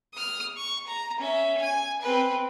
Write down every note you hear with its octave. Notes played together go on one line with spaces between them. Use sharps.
D#6 F6
C#6
A#5
C#4 E5
G#5
C4 B4